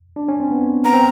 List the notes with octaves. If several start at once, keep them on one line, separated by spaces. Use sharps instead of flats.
D4
C#4
C4
B3
B3 A#5
C4